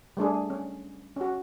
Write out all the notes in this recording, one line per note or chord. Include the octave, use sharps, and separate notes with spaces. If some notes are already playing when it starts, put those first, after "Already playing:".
G3 A3 D4 G#4
C#4
C#4 F#4